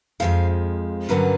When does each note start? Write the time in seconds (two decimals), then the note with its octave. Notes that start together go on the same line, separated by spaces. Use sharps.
0.20 F2 C#3 F3 G#3 F5
1.09 G2 D3 F#3 A#3 C#4 B4